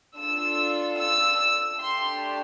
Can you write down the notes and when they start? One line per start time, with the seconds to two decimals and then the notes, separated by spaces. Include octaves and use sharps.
0.17 D4 F4 A4 E6
0.99 E6
1.79 A3 D4 G4 C6